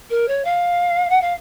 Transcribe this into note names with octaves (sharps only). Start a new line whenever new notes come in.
A#4
C#5
F5
F#5
F5